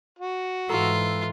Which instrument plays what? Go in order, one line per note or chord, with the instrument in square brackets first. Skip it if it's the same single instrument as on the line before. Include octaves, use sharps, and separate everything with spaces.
[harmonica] F#4
[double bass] G#2 E3 [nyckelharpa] F4 [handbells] A4 A#5 E6